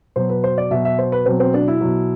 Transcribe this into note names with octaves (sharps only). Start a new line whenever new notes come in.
B2 F#3 C5
B4
C5
D5
B2 F#3 E5
E5
C5
B4
B2 F#3 C4
C4
D4
E4
B2 F#3